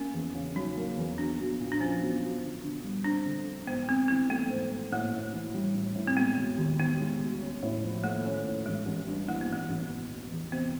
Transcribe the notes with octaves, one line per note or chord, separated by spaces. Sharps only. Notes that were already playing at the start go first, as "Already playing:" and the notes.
Already playing: A#3 C#4
E2
C#3
F#3 D#4
A#3
E2
B1 D4
B1
A#2
D4
F3 C#4
B1
B1
D3
D3
G3
C4 D4
D3
D3
G#2 B3
G#2 C4
E3 C4
A3 B3
G#2
G#2
A2 A#3
A2
E3
G3
A2
A2
C4
G#3 B3
E1
D#2
D#3 B3
G#3
E1
C#4
A2
F3
A3 A#3
C#4
A2
A1 G#3
A1
G2
E3 A#3
B3
A1 A#3
A1
E1
E1
E2
C3 B3